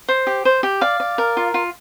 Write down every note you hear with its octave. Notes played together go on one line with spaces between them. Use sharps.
C5
G4
C5
G4
D5 F5
D5
A#4
F4
F4